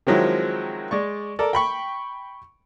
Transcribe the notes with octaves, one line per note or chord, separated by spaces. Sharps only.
D#3 F3 F#3 G#3 C4 E4
G#3 D5 C#6
A4 A#4 D5
G5 B5 C#6